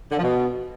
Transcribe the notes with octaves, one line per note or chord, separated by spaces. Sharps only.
D3
F3
B2